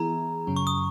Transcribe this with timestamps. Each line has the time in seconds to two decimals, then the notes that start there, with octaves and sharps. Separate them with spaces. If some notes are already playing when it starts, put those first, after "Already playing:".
Already playing: E3 B3 E4 G#4 A#5
0.47 F#2 C#3 F#3 C#4
0.56 C#6
0.67 D#6